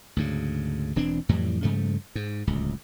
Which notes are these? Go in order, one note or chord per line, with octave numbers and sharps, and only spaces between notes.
D2 G#2 C#3
E1 E3 C4 D4
F2 A2 E3 G3
G2 C#3 F3 A3
G#2
D1 C#2